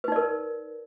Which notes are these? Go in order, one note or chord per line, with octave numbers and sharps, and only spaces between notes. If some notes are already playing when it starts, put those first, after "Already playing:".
D#4 A#4 B4 D5